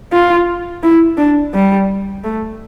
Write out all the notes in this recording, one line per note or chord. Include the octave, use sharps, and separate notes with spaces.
F4
E4
D4
G3
A3